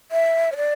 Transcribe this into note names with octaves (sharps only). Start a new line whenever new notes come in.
E5
C#5
D5